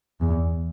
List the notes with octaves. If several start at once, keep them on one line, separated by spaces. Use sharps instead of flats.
E2